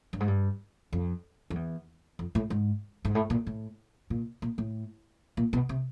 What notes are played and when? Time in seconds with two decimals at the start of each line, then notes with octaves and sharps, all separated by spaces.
0.13 G2
0.20 G#2
0.28 G2
0.93 F2
1.50 F2
1.55 E2
2.19 F2
2.35 A2
2.50 G#2
3.05 G#2
3.15 A2
3.30 A#2
3.47 A2
4.10 A#2
4.42 A#2
4.58 A2
5.37 A#2
5.53 B2
5.69 C3